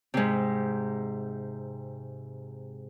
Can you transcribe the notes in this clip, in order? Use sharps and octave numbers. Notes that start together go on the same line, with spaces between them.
G#2 C3